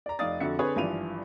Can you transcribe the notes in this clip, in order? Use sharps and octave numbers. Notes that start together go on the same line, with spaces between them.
D5 A#5
F1 D#4 D5 F5 D#6 A6
F2 D3 F#4 E5 C#7
D3 C4 G#4 B4 C#5
G#1 G2 E3 F3 D#7 F7